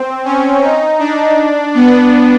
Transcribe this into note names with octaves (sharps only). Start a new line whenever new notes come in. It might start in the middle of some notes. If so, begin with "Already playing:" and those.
Already playing: C4
C#4
D#4
D4
B3